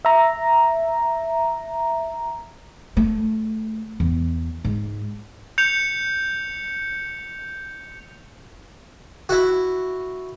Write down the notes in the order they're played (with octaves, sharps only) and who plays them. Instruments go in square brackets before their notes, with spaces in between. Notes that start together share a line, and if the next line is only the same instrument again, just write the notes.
[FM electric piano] E5 A#5
[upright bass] A3
E2
G#2
[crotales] G6 C#7 F7
[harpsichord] E4 F#4